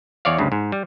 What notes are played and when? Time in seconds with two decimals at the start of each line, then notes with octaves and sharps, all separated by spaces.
0.25 E2 C#5 D5 F5
0.38 D2 G2 C#3
0.52 G#2
0.72 G3